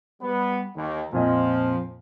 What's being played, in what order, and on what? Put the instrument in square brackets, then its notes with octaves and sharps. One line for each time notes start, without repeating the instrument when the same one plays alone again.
[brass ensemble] G3 B3 B4
D#2
[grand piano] F2 A#2 D#5 [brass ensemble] F3